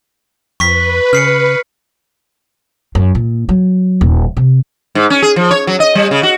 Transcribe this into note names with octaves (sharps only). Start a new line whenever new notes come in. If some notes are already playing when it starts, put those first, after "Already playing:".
F2 B4 C#6 B6
C#3 F6 C7 C#7
F#2
A#2
F#3
D#1
C3
G#2
C#4
G#4
F3
C#5
F#3
D#5
G3
C#3
F#4